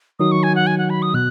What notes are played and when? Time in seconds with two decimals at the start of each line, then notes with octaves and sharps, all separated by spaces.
0.19 D#3 F#3 D#4 F#4 D#6
0.32 C#6
0.43 G#5
0.56 F#5
0.67 G#5
0.78 F#5
0.90 B5
1.02 D#6
1.14 B2 F#6